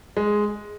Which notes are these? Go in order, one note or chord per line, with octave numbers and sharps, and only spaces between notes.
G#3